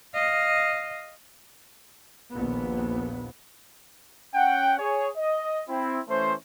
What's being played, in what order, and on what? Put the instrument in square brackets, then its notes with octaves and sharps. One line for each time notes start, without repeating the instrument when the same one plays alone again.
[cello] D#5 F5
[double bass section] A#1 D#2 A#2 B3
[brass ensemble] C#4 F#5 G5
G#4 C#5
D#5
C4 E4
E3 A3 C#4 C5